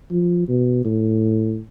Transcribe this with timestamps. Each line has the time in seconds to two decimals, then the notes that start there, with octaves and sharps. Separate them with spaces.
0.11 F3
0.48 B2
0.85 A2